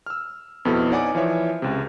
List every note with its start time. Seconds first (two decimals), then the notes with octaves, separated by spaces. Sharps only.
0.06 E6 F6
0.65 F2 B2 B3 E4 A4 F6
0.90 D#4 C#5 D5 F#5 G#5 D6
1.15 E3 F3 C#5 E5
1.62 C#2 C3